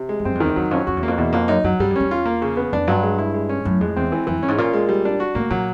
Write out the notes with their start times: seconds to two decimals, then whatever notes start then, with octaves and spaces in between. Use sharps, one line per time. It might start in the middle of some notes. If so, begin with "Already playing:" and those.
Already playing: C3
0.09 G#3
0.19 G2
0.25 F#2 C4
0.35 F2
0.40 D#3
0.45 E2
0.56 E2 F#3
0.71 F2 C#4
0.87 F2 F#4
0.97 E2
1.03 F2 A#3
1.18 E2 B2
1.33 F2 A#3
1.48 F#2 D#4
1.64 F#2 F#3
1.79 G2 G3
1.90 F#2
1.96 E2 C#4
2.11 F4
2.25 A#3
2.42 C#3
2.57 B3
2.73 F2 D4
2.87 G2 F#3
3.03 G#3
3.18 E4
3.34 G#3
3.49 C#4
3.65 F#2 A2
3.81 F2 G#3
3.97 E2 C4
4.12 E3
4.27 F2 E3
4.38 G2 C#4
4.48 G#2
4.58 A#2 F4
4.73 G#3
4.89 G3
5.05 D4
5.20 F#4
5.35 A2 A#3
5.50 A#2 F#3